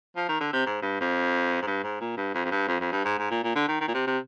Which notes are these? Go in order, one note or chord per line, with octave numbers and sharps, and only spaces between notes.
F3
D#3
D3
C3
G#2
G2
F2
G#2
G2
G#2
A#2
G2
F2
F2
G2
F2
F2
G2
G#2
G#2
A#2
A#2
D3
D#3
D#3
A#2
C3
C3